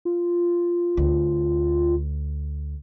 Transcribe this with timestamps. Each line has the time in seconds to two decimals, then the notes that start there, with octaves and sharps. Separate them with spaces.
0.05 F4
0.97 D2